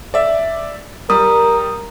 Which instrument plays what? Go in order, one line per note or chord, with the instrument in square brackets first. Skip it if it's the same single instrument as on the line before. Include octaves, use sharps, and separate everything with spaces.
[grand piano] D5 E5
[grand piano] G3 [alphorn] A#4 [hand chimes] D#6